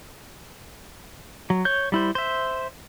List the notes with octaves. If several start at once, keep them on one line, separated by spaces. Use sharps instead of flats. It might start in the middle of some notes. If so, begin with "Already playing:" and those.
F#3
C#5 G6
G3 E4 C5
C5 E5